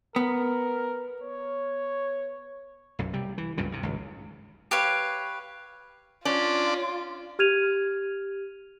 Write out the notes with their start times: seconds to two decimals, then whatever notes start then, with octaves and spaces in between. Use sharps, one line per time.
0.16 B3 A#4
1.22 C#5
2.99 B1 F#2
3.13 C3 G3
3.38 E3
3.58 C#2 G2 A#2 C#3
3.72 G2 C3
3.83 G#1 C#2
4.71 G4 B4 C#5 F5
6.25 C#4 D4 F4 D5
7.39 G4 F6 G#6 D#7 F7